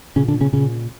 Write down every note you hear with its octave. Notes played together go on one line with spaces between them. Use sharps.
A#2 C#3 C#4
D3 D4
C#3 C#4
A#2 C#3 C#4